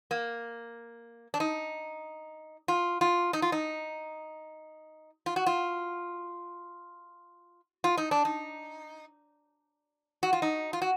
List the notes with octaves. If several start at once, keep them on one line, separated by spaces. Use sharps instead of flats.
A#3
D4
D#4
F4
F4
D#4
F4
D#4
F4
F#4
F4
F4
D#4
D4
D#4
F#4
F4
D#4
F4
F#4